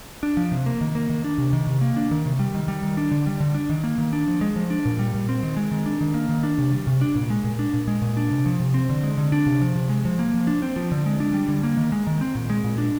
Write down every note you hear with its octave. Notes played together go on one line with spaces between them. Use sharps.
D4
F3
C3
A#3
D#3
A#3
D#3
D4
C3
D#3
C3
A#3
D4
D#3
C3
G3
D#3
G3
D#3
D4
D3
G3
D3
D4
D#3
A#3
D#3
D4
F3
G#3
F3
D4
A#2
G3
A#2
C4
D#3
G#3
D#3
D4
D#3
A#3
D#3
D4
C3
G3
C3
D4
A#2
G#3
A#2
D4
A#2
G#3
A#2
D4
C3
F3
C3
C4
D3
G#3
D3
D4
C3
F3
C3
G#3
F3
A#3
F3
D4
C4
F3
D3
G#3
D4
G3
D3
A#3
D#3
G#3
D#3
C4
A#2
G#3
A#2
D4